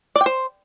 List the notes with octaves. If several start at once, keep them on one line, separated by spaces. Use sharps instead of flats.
D5
G5
C5